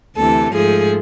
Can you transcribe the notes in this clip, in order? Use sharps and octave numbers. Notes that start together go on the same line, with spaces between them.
D2 C3 E3 A4
G#2 F3 A3 G#4